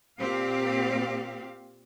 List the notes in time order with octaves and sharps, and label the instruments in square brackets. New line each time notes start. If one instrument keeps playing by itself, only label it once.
[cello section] A#2 C4 G4 F5